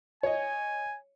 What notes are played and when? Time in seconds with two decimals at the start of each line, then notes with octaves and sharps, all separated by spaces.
0.23 C#5 D#5 G#5